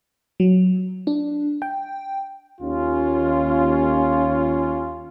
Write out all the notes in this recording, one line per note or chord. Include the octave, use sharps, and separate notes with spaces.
F#3
D4
G5
D#2 C#4 F4